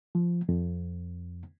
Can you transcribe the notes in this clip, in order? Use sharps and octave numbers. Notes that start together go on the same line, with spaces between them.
F3
F2